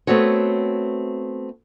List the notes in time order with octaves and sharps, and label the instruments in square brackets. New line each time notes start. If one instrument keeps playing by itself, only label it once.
[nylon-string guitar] A3 B3 C4 F#4 C#5